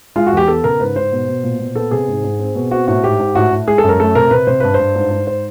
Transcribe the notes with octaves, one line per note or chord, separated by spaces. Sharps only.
G#3 F4
F#4
E2 G4
B3 A4
C#3 A#4
G#2 B4
G#2 C5
B2
B2
A#2
A#2
B3 A4
C3 G#4
G#2
G#2
C4
B2
C4 F#4
A2 F#4
G#2 G4
G#2
A2 F#4
A2
G#3 G#4
A4
F#2
A#4
A3 A4
C3 A#4
C3 B4
C3 C5
G2 B4
G2 C5
G#2
G#2
C5